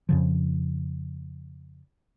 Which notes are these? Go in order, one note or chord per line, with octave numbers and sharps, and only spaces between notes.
F2 C#3 F3